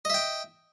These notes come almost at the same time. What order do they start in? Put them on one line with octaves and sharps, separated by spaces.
D#5 E5 G5